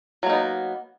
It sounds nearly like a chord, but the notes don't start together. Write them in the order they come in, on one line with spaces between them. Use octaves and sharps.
F#3 A#3 D#4 B3